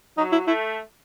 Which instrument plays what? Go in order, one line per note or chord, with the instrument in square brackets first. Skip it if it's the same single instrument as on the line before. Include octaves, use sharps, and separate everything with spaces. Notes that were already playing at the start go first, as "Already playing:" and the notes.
[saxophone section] F#3 [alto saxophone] D#4
[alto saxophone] E4
[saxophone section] A3 [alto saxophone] E4